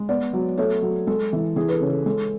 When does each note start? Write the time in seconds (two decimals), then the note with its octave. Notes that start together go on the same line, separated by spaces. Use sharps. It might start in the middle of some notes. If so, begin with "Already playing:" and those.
Already playing: G#3
0.09 B3 B4 D5
0.33 F#3
0.58 A3 A4 C#5
0.82 F#3
1.07 G#3 A4
1.33 E3
1.56 E3 G#4
1.69 B4
1.73 A4
1.81 C#3
1.90 A4
2.06 G#3 A4